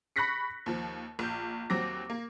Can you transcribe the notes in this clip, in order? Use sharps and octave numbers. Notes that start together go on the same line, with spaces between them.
B5 C#6 F#6 A#6 B6 C#7
D#2 F3
A#1 G6
D#2 F#3 C4 D6 A#6
A#3